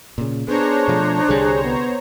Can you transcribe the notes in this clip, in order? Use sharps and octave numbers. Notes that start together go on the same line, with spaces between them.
A#2 C#3
B3 D4 G#4 C5 C#5 A#5
B2 F3 A3
C2 D3 G3 G#4
B3